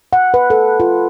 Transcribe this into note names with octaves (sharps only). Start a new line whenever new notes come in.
F#5
B4
A4
F4